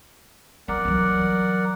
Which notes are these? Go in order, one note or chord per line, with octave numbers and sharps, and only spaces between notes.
F#3 A#4 D5 F#5
E3 F#3